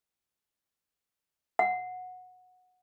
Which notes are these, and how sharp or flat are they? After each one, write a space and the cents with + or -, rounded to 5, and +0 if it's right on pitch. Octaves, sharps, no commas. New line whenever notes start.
F#5 -15